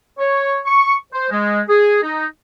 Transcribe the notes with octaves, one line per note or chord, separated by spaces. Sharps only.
C#5
C#6
C5
G#3
G#4
D#4